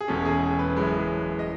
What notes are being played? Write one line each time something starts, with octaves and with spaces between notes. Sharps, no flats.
G#4
E1 E2 B2 G#3 C#4 A4
G#4
B4
F#1 F#2 E3 G#3
D#5